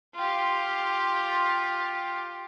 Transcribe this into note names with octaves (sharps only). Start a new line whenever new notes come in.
F4 G4